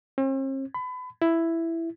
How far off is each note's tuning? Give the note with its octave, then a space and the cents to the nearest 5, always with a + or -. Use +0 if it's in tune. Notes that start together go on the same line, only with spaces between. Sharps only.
C4 +45
B5 +30
E4 +5